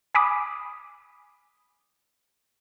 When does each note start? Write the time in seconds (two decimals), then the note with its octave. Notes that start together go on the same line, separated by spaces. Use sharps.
0.15 G#5 B5 D6 D#6